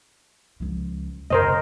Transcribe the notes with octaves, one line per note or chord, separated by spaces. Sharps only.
C#2 F3
F#2 C#3 A#4 C5 D#5